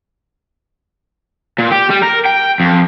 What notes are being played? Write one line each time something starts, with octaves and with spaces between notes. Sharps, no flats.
A#2
G4
G3
A#4
G5
F2